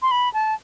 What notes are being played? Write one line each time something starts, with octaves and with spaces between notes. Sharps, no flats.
C6
B5
A5